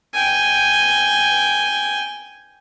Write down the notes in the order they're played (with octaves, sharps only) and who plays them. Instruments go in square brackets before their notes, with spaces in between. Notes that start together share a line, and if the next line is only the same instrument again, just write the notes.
[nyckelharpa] G5 G#5